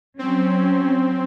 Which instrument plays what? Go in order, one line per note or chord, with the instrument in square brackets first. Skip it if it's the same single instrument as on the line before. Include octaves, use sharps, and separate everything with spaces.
[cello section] F#3 C#4 [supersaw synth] C4